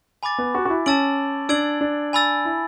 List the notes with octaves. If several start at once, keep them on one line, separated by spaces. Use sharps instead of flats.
G#5 B5 D6 A6
B3
F#4
F#4
E4
C#4 A5 E6 A6 D7 F#7
D4 E6 G#6 D7 F#7
D4
G#5 B5 E6 A6
E4